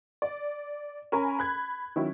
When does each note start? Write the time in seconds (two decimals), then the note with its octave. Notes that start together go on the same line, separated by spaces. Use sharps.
0.22 D5
1.12 C#4 A#4 G#5 A#5 B5
1.39 B5 F#6 G#6
1.96 D#3 F#3 C#4 E4